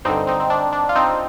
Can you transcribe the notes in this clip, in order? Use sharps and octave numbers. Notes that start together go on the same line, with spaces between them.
G2 D3 C4 D#4
C4 D#4
C4
D4
D4
F4
C4 D#4